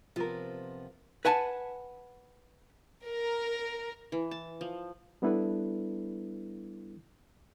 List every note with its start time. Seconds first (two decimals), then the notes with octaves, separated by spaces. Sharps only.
0.16 C3 F3 B3 F4 A#4
1.25 B4 F#5 G#5 A5
3.08 A#4
4.12 E3
4.31 A5
4.61 F3
5.22 G3 B3 D4 E4 A4 B4